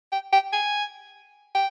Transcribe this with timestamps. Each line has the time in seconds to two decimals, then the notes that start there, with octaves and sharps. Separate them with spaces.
0.12 G5
0.33 G5
0.53 G#5
1.55 G5